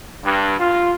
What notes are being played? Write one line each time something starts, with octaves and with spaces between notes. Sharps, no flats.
G2
F4